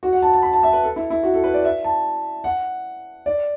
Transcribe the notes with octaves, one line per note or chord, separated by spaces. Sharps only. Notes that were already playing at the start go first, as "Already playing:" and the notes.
F#4
F#5
A5
A5
B5
A5
E5
B4
A4
E4
E4
F#4
A4
B4
D5
E5
A5
F#5
D5